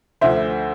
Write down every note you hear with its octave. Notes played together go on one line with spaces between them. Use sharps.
D2 D3 F3 C5 E5